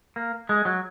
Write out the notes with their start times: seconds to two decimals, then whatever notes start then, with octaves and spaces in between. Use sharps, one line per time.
0.16 A#3
0.49 G#3
0.65 F#3